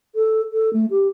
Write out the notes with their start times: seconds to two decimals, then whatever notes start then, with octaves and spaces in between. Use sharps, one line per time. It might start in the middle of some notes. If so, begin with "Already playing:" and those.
0.15 A4
0.52 A4
0.73 A3
0.90 G4